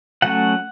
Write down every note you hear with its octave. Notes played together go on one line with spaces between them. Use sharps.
F#3 A3 C#4 F#5